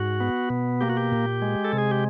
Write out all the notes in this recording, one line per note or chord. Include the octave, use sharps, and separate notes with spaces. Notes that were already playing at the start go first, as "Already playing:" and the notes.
Already playing: G#2 F#4
B3
B2
A#3 G4
F#4
G4
A#2
G#3
A4
C3
G#4
G4